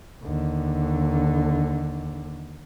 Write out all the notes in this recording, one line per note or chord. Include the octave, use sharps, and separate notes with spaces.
D#2 D3